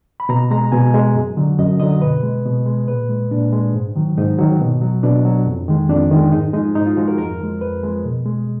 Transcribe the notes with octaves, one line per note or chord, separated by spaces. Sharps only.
B5
B2 A#5
G#3 A#5
B2 G#5
G#3
F#2
D3 F#3
F#2 D#5
D3 F#3 D#5
B2 B4
G#3
B2
G#3
A#2 B4
G#3
A#2 D4
G#3
G#2
D#3 F#3
G#2 D#4
D#3 F#3
B2
F#3
B2 D4
F#3
F2
D#3 G#3
F2 D4
D#3 G#3
G#2 D#4
F3 G#3 D#4
G#2 D#4
F4
F3 G#3 F#4
A#4
F2 A#4
F3 G#3
F2 B4
F3 G#3
B2
G#3